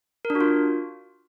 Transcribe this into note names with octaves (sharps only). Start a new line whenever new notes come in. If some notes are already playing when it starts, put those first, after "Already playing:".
A#4
D4
F#4
F4